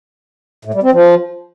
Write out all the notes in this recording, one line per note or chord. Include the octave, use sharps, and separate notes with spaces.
A2
G3
C4
F3